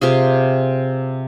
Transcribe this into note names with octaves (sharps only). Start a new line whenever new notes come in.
C3 F4 G#4